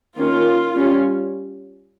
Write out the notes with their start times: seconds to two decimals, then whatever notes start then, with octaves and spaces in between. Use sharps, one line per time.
0.17 D#3 A#3 C#4 F4
0.75 G3 C#4